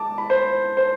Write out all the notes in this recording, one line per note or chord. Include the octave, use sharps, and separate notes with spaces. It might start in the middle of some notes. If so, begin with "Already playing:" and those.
Already playing: G#3 A5 D6
B5
C5
C5